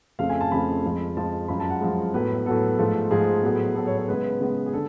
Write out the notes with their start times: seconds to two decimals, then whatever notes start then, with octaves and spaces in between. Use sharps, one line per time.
0.19 F2 C#3 F3 A3 F5
0.30 G#5
0.41 A5
0.51 F2 C#3 F3 A3 B5
0.84 F2 F3 G#3
1.17 F2 F3 G#3 A5
1.48 F#2 F3 G#3 B5
1.60 A5
1.70 F#5
1.81 F#2 F3 G#3
2.14 A2 F#3 B3 B4
2.46 A2 F#3 B3 A4
2.78 G#2 F3 A3
3.11 G#2 F3 A3 G#4
3.43 A2 F#3 B3
3.75 A2 F#3 B3 A4
3.87 C#5
3.98 C#5
4.08 C#3 G#3 B3 B4
4.40 C#3 G#3 B3
4.66 G#4
4.73 D3 A4